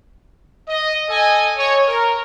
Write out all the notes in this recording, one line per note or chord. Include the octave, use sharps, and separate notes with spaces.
D#5
A4 D#5 G#5
C#5
A#4